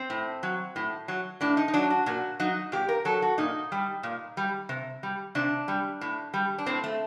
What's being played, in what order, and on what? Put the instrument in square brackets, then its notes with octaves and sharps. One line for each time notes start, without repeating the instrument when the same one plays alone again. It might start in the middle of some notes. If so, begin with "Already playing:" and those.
Already playing: [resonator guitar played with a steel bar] C4
A2
F#3
A2
F#3
A2 D4
D#4
D#4
F#3 D4
F#4
A#2 F#4
F#3 D#4
A#2 G4
A#4
F#3 A4
F#4
A#2 D#4
G3
A#2
G3
C3
G3
C3 D4
G3
A2
G3
D4
A2 C4
A3